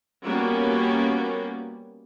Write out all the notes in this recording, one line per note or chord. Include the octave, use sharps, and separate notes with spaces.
G3 A#3 B3 C#4 F#4